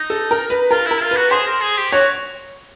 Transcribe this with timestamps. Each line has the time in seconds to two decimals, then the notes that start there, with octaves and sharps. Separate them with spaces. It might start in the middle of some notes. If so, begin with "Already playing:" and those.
Already playing: D#4
0.10 A4
0.31 A#4
0.50 B4
0.71 F4 A#4
0.86 E4 A#4
1.01 F4
1.11 F#4 B4
1.31 G#4 C5
1.47 A#4
1.61 G#4
1.77 G4
1.92 F#4 C#5